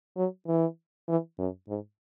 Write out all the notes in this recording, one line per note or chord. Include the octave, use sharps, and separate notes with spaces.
F#3
E3
E3
F#2
G#2